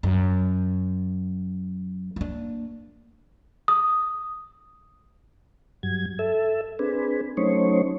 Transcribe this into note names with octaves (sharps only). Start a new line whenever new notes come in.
F#2
A#3 D4
D#6
G2 F#3 G#6
A4 E5
C4 D4 G#4 B4
F#3 A3 C#4 D#4 C5 C#5